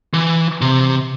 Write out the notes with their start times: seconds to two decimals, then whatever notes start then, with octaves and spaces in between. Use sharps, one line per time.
0.14 E3
0.61 C3